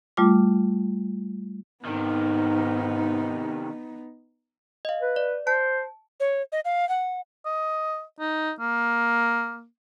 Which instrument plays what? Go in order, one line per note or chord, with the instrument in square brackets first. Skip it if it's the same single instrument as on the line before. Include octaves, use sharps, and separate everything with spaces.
[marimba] G3 A3 F4 D6
[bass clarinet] G#2 [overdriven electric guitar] C3 D#3 [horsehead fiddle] B3 D#4
[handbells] D#5 F5
[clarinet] B4
[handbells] D5
[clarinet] C5 [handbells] A5
[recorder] C#5
D#5
F5
F#5
[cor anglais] D#5
D#4
A#3